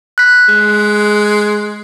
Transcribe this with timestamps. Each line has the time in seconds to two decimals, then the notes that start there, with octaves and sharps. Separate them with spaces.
0.18 F#6 B6
0.49 G#3